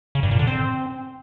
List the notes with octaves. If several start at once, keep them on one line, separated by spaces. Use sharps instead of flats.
C#3
G2
A#2
D3
C4